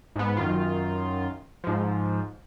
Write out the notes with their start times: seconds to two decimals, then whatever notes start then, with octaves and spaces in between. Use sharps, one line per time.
0.16 G#2 B3
0.37 F#2 D#3 F4
1.64 G#2 F3